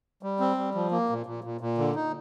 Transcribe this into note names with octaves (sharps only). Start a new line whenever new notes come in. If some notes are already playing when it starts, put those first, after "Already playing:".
G3
C4
G3
F3
A#3
A#2
A#2
A#2
A#2
D3
D#4